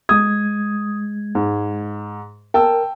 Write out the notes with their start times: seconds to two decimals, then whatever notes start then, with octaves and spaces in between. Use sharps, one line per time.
0.09 G#3 D#6 G#6
1.35 G#2
2.54 A#4 G5 A5 E6